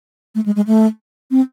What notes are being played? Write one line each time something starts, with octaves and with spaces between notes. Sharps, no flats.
A3
G#3
G#3
A3
C4